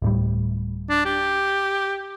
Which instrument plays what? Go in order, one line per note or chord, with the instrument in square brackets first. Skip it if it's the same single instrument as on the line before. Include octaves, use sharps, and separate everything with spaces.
[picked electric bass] D1 A2 G3
[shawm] D4
G4